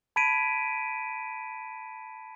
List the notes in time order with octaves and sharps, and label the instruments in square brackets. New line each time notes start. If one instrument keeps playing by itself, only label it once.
[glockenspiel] A5 B5 G#6 B6 D7 D#7